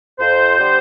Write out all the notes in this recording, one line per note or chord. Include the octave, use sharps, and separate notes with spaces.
F2 C5
D3 G3